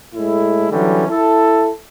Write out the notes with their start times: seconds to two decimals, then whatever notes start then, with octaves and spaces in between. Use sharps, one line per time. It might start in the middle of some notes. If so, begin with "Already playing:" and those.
0.15 A2 G#3 A3 E4
0.71 D3 E3 F#3 G3 C#4
1.08 E4 A4